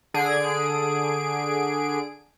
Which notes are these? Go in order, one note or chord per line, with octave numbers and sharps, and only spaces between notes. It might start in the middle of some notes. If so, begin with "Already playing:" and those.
D3 G#4 D7